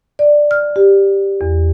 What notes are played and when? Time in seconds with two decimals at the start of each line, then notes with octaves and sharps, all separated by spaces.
0.19 D5
0.51 F6
0.76 G4
1.41 E2